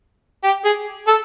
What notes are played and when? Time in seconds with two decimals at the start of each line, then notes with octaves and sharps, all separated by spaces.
0.44 G4
0.65 G#4
1.07 A4